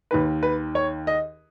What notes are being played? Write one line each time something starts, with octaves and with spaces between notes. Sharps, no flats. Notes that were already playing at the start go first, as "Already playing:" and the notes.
D#2 D#3 B4
B4
C#5
D#5